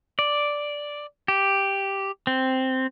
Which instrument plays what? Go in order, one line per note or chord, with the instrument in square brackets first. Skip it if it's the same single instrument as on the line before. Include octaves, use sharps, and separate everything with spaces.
[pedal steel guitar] D5
G4
C4